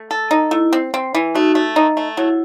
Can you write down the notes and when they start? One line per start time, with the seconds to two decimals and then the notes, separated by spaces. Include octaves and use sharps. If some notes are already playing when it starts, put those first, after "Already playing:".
Already playing: A3
0.11 A4
0.31 D#4
0.51 A3 E4
0.73 C4
0.94 C4
1.15 E3
1.35 A3 D#4 F#4
1.55 A3
1.76 D#4
1.97 A3
2.17 F#3 E4